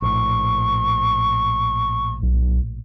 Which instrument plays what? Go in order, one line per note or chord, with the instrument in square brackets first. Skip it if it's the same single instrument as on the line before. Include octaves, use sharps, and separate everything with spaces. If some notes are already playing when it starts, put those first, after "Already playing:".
[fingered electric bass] A#1 A2 [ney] C#6
[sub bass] B1